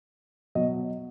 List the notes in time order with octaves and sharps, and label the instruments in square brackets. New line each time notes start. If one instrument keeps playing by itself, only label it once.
[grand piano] B2 F#3 D#5